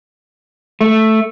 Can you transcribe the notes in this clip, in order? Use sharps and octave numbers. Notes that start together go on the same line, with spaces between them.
A3